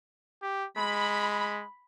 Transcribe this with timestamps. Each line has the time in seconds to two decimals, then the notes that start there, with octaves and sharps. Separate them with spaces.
0.42 G4
0.78 G#3 B5